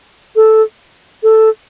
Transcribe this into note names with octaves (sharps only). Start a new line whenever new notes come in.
A4
A4